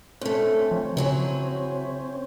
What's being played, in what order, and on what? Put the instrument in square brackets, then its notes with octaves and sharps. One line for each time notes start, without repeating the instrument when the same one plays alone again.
[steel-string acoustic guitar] G2 A3 [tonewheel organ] C4 C#4
[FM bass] F3
[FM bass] C#3 [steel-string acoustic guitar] F#3 E4 G#4